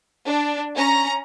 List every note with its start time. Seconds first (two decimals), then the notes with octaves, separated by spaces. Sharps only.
0.25 D4
0.74 C#4 A#5